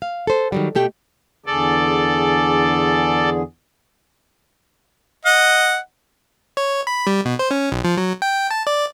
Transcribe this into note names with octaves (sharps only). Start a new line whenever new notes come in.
F5
A4 C5
D#3 F#3 G3
B2 A3 G4 G5
E2 D3 G#4 A4 D5
D#5 F#5
C#5
B5
G3
B2
C5
C#4
B1
F3
F#3
G5
A5
D5